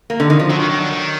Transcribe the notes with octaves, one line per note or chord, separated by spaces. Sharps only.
A#3
D3
D#3
F3
D#3 F#3
D#3
D#3
D3
D#3